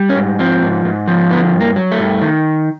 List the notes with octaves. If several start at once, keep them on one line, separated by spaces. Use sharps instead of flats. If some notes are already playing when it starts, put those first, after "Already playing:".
Already playing: G3
C#4
G#2
F3 C4
G#2
G#2
F3
D3 B3
G2
A#3
F#3
A3
G2
D#3